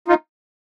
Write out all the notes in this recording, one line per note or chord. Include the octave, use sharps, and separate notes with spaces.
D#4 F4